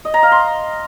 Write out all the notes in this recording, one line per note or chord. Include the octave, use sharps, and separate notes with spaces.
D#5
A#5
F5
C6